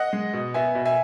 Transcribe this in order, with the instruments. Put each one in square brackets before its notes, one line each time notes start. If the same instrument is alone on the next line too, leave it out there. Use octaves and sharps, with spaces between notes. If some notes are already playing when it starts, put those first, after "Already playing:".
Already playing: [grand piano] D#5 F#5
G#3
B2
B3 E5 G#5
B2
E5 G#5